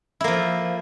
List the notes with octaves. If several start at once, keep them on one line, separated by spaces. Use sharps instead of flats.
F3 A#3 E4